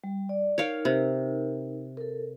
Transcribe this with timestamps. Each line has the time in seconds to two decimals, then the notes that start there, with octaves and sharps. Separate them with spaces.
0.04 G3
0.29 D5
0.58 D#4 A#4 C#5 F5 G5
0.85 C3
1.97 A4 A#4